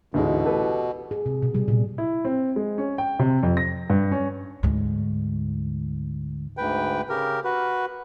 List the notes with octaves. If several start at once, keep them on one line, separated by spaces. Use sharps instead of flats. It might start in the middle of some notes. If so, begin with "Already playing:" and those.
A1 D2 G#2 B2 G#3
G4 A4 B4
G#4
C3
B2
G3
A#2
E4
C4
G#3
C#4
G5
C3
F2
A#6
G2
C#4
D2 G#2
D2 G#2 B4 G5
C#3 G4 A#4
F#4 B4